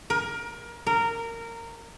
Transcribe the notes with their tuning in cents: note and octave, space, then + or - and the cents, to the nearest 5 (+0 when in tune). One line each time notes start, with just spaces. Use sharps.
A#4 +25
A#4 -15